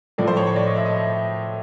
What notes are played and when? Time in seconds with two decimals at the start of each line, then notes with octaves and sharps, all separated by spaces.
0.18 A2 F3 A3 D5
0.27 C5
0.37 C#5
0.47 C#5
0.56 D5
0.66 D#5
0.76 E5
0.85 D#5